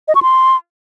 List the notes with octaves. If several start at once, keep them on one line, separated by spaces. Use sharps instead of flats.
D#5
C#6
C6